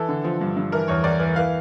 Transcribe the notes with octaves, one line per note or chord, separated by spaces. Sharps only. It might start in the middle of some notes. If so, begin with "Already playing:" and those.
Already playing: E3 A4
D3
F3
G2
G2
E3 A#4
E2 C#5
E2 D5
E3
E3 F5